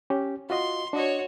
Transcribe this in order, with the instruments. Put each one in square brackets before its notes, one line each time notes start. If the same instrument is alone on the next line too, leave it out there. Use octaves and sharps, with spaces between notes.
[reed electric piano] C#4 G4
[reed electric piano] F4 F#4 D#5 [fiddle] C6
[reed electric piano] D4 D#5 [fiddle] F#4 C#5